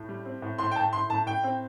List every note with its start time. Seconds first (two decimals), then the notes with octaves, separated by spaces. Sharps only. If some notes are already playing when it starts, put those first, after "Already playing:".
Already playing: A2
0.09 G3
0.25 C4
0.42 A2
0.59 A2 C6
0.71 G5
0.76 A2 A5
0.93 A2 C6
1.10 A2 A5
1.26 A2 G5
1.44 C4